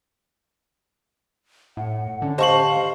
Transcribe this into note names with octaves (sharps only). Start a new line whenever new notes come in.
A2 F#5
D3 C#4
G4 C5 D#5 F5 A5 C#6 F#7